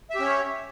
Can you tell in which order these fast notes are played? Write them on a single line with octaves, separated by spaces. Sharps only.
E5 G4 C#4 C#5